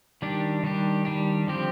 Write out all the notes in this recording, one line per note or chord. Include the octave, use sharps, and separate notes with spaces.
D#3 G3 D4 G4
D#3 G3 D4 G4
D#3 G3 D4 G4
D3 F3 C4 G4